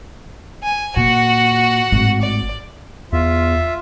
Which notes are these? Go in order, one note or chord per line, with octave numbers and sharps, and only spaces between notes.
G#5
A#2 F#4 F#5
G#1 A2
D5
E2 F4 E5